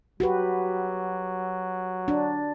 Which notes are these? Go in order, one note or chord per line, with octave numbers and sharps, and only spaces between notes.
F#3 F#4 G4 B4
D4